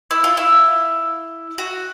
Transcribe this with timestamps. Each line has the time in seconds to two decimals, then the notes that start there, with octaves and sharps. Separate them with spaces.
0.11 E4
0.24 F4
0.37 E4
1.58 F#4